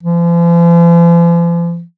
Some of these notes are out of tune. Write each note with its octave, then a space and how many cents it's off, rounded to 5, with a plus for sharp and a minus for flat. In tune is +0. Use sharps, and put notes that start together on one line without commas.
F3 -45